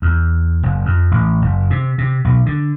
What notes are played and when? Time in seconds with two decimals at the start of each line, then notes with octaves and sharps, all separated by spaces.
0.02 E2
0.63 F#1
0.85 F2
1.11 A1
1.42 F#1
1.70 C3
1.98 C3
2.25 B1
2.46 D3